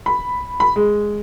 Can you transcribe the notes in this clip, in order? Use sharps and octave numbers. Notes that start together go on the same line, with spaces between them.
B5
B5
G#3